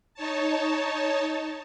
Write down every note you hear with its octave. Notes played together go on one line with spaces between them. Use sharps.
D#4 C#5 A5